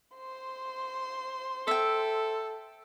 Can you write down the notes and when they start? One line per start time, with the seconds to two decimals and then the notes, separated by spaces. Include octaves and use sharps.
0.15 C5 C6
1.68 A4 E5 G5